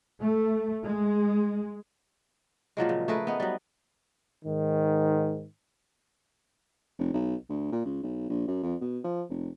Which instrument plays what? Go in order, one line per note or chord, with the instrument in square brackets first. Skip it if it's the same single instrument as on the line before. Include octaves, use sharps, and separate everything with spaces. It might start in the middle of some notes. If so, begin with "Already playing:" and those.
[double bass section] A3
G#3
[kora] A#2 F3 F#3 G#3
C#3
A3 G#4 A#4 B4
B3 D#4
F#3 G3
[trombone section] G#2 D#3
[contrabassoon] F1
B1
D2
A#2
C#2
B1
A#1
F#2
F2
B2
F3
F1